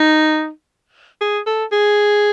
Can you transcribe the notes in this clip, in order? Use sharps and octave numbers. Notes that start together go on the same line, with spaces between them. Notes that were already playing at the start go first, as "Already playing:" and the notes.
Already playing: D#4
G#4
A4
G#4